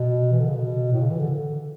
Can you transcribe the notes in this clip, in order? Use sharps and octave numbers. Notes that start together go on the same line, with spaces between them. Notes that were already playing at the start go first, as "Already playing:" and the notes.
Already playing: B2
E3
D3
C#3
B2
A2
C#3
E3
D3
D3